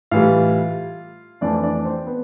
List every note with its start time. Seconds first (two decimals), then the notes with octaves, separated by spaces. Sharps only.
0.11 A2 E3 G3 F4 F5
1.41 F2 E3 A3 D4 D5
1.63 D4 D5
1.85 C4 C5
2.07 B3 B4